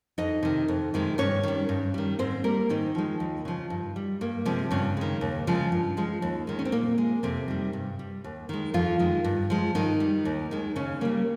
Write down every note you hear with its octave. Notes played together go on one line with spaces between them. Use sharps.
F2 D#4 D#5
C3 D#3
F2
C3 D#3 G#3
G2 C#4 C#5
D#3 G3
G2
D#3 G3
G#2 C4 C5
G3 A#3 A#4
G#2 D#3 D#4
F3 G#3
D#2
C#3 F3
G2
G3
G2 A#3
C3 F3 G#3 C4
G2 C#3 C#4
D#3 G#3
D#2
C#3 F3 G#3
G2
F3 G#3
D#2
D#3 G#3
C#4
C4
A#2 A#3
G#3
F2 C3 C4
D#3 G3
G2
G3
D#2
D#3 G#3
F2 F3 F4
D#3 G#3
G2
F3 G#3
G2 D#3 D#4
G3
D#2
D#3 G#3
D#2 C#3 C#4
C#3 G3 A#3